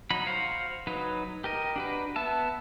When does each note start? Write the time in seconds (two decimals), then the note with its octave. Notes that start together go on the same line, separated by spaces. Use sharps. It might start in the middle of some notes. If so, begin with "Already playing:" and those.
0.10 F#3 D#4 B5
0.26 F#4 C5 F5
0.87 F#3 D#4 B4
1.44 G4 A#4 D#5
1.76 D4 F#4 B4
2.16 B3 E5 A5